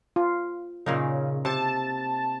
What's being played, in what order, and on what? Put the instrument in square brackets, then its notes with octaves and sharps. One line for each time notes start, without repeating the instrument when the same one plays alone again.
[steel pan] F4
[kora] A#2 A#3 D#4 [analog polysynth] C#3
[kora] C3 [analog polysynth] A5